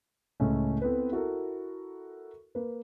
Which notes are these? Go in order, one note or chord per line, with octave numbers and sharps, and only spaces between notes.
C#2 A2 A3 C#4
B3 C4 E4 A4 B4
E4 F#4 A4 A#4
A#3 B4